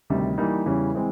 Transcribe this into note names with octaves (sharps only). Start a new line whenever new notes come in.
D2 C3 D#3 G3
E3 G3 A#3 D#4
E2 C#3 E3 G3
E3 G#3 C4